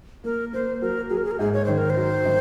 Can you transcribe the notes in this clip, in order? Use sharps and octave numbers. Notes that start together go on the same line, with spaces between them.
A#3 A#4
A#3 C5
F#3 A#4
F#3 G#4
A#4
G#4
A#4
G#2 G#4
C#5
D#3 C5
A#4
C5
F#3
D#3